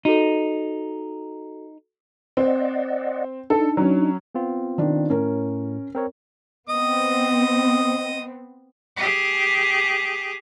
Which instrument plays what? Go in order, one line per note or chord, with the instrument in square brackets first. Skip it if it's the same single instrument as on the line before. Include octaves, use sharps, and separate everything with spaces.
[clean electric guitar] D#4 [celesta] F#4 A4
[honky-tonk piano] C4 [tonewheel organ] D5 D#5 F#5
[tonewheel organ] D4 D#4 [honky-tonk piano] A4
[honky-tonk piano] F#3 C#4
[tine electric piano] B3 C4 F4
[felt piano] D#3 D4
[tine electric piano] A2 [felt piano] C#4 A#4
[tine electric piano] C4 A#4 C#5
[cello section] B3 C4 [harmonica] D#5 D#6
[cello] G4 G#4